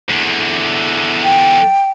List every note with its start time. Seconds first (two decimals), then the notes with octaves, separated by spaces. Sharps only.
0.10 E2 D3
1.24 G5